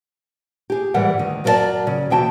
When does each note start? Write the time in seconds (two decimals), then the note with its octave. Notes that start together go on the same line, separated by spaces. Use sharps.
0.70 G4 G#4
0.94 G#2 E3 G3 A#4 F#5
1.18 D2 D#3
1.44 F#2 F#3 A#4 C5 D5 A5
1.87 C#3
2.10 D#2 B2 E3 F#4 G5 A5